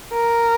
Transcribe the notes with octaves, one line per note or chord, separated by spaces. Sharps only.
A#4